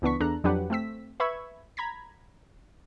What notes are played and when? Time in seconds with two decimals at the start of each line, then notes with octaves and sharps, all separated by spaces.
0.02 C#2 E3 B3 D4 C#6 B6
0.20 E2 D4 A4 A#5 F#6
0.44 F2 F#3 D4 G4 B4 F#5
0.70 A3 C4 E6 B6
1.20 B4 E5 B5 C#6 E6 G#6
1.77 A#5 B5 G#6 B6